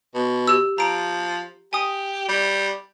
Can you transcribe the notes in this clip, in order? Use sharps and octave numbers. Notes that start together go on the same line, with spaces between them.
B2
G4 E6
F3 A#5 D7
G4 G#5 D#6
G3